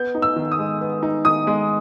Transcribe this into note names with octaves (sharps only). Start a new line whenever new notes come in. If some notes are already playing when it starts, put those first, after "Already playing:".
Already playing: B3 G6
D#4
E6
D#3
D#6
G#3
B3
D#4
D#3 D#6
G#3